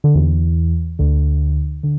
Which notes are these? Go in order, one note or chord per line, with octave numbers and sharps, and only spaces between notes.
D3
E2 E3
D2 D3
D3